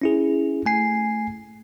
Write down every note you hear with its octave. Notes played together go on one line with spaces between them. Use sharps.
C#4 E4 G#4
A3 G#5 C7